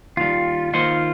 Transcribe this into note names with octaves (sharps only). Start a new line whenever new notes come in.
D#2 D#3 G3 F4
D#3 A#3 D#4 F4 C5